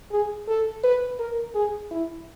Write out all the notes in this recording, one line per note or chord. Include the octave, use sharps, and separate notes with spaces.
G#4
A4
B4
A#4
G#4
E4